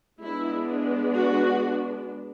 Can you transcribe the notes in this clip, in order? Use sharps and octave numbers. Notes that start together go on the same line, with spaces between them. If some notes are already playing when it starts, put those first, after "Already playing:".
G#3 B3 D4 E4
F#4